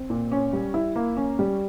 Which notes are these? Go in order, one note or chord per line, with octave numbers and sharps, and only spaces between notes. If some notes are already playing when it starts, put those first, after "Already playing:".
Already playing: C4
A#2
C#4
G3
E4
A#3
C#4
G3